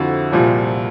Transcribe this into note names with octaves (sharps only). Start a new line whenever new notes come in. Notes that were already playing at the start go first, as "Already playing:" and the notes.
Already playing: F2 D3 F3 E4 F#4
C2 A#2 F3